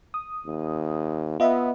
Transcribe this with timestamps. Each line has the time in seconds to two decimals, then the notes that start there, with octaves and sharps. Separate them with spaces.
0.14 D#6
0.46 D#2
1.40 B3 F4 D#5 E5